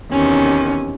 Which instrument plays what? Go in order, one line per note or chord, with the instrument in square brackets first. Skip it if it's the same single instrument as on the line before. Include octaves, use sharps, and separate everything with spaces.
[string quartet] E2 C3 D#3 C#4